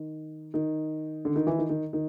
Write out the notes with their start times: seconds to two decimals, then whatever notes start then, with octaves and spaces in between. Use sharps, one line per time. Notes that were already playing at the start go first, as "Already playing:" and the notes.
Already playing: D#3
0.54 D#3
1.25 D3
1.36 D#3
1.47 E3
1.58 D#3
1.70 D#3
1.93 D#3